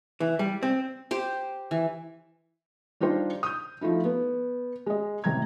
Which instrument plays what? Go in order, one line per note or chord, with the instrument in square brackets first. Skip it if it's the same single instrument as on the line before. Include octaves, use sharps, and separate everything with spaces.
[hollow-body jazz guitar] E3
G3
C4
[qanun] G4 C5
E3
[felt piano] G3 D4 D#4 F4 C5
D#6 G6
F3 A3 D#4 E4
B3
G#3 D#5
A1 C3 A#5 G#6